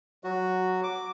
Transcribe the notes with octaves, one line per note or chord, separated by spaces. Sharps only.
F#3 F#4
D6